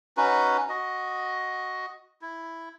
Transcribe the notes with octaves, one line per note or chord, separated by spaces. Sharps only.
C#4 D#4 F#4 B4
F#4 D#5
E4